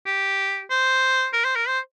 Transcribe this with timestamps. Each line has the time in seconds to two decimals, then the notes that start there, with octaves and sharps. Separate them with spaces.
0.06 G4
0.70 C5
1.33 A#4
1.45 C5
1.56 A#4
1.68 C5